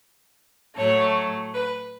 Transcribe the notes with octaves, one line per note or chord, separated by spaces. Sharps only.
A2 F#3 A3 C#5
B4